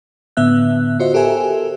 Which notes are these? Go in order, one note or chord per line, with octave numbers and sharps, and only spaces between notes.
A2 D3 B3 E5 F#6
F4 F#4 C5 D#5 E5
G4 A4 A#4 C5 E5 G#5